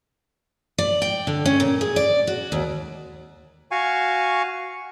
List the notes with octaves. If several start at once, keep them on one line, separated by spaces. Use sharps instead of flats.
D5
G5
D3
C#4
A#2
G#4
D5
F#4
D#2
F#4 F5 G#5 C#6